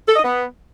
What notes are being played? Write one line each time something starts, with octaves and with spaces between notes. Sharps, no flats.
A4
D#5
B3